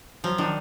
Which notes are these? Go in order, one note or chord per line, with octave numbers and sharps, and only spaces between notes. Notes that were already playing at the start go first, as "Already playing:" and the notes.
F3 F#3
D#3 D4